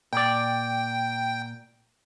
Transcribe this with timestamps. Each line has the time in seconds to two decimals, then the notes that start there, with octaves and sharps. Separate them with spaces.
0.13 A#2 D5 G5